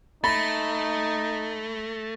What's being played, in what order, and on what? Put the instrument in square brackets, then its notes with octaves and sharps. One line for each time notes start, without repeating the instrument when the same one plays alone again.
[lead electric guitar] A3 [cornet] D#4 [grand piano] B5 [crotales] A6 A#6